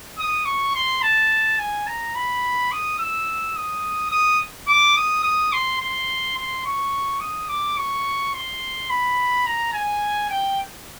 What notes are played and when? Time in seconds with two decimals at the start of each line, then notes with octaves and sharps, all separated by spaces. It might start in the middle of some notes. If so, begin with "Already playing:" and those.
0.19 D#6
0.45 C#6
0.75 C6
1.02 A5
1.59 G#5
1.87 A#5
2.15 B5
2.72 D#6
2.99 E6
3.56 D#6
4.11 D#6
4.68 D6
4.97 D#6
5.23 D#6
5.53 C6
5.80 C6
6.37 C6
6.65 C#6
7.20 D#6
7.49 D6
7.77 C#6
8.34 C6
8.90 B5
9.46 A#5
9.73 G#5
10.30 G5